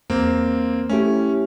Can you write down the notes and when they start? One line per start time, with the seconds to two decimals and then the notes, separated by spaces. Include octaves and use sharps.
0.10 E2 A#3 C4
0.90 A3 C#4 E4 G4